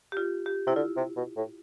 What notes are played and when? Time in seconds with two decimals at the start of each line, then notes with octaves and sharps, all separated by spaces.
0.12 G4
0.17 F4
0.46 G4
0.67 C3 E4
0.76 D3 F4
0.97 C3
1.17 B2
1.37 A2